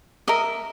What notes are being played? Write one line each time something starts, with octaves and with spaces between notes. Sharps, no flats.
A#4 D#5 E5